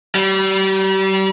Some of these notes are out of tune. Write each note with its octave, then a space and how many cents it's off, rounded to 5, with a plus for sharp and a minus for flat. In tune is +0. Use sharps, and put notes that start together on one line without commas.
G3 -35